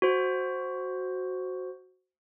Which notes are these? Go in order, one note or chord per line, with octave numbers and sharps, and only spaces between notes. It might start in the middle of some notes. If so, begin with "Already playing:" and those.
F#4 C5